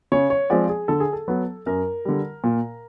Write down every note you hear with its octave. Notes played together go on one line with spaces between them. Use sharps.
C#3 C#5
C#5
F3 G#3 C4 D5
G#4
D3 A4
G#4
A4
F#3 B3
F#2 A#4
D3 G3
A#2